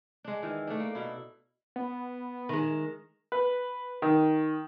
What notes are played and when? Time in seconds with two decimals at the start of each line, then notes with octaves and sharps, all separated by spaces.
0.24 G#3 D4
0.43 D#3 E3
0.67 A3 D4
0.80 A#3
0.95 B2 E4
1.76 B3
2.49 D#3 G#3
3.32 B4
4.02 D#3